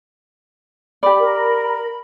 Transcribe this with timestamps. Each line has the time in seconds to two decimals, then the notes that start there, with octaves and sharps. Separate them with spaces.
1.03 G4 D5 B5
1.19 A#4